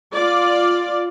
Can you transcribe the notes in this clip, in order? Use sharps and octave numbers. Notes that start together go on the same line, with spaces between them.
F4 D5